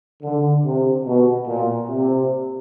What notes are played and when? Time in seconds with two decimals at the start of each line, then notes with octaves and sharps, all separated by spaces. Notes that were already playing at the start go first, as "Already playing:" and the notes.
0.23 D3
0.65 C3
1.06 B2
1.48 A#2
1.89 C3